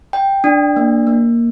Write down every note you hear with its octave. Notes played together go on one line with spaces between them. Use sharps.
G5
D4
A#3
A#3